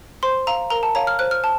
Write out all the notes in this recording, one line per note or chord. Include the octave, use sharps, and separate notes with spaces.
C5 C6
F5 A#5
A#4 A#5
A5
C#5 F5 A#5
F6
C5 F#6
F6
A5